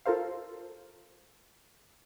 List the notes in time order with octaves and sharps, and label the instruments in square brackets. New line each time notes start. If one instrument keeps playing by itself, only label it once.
[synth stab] F4 A4 A#4 C5 F5